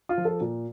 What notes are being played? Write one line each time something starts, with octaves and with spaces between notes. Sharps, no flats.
F4
F3
A4
A#2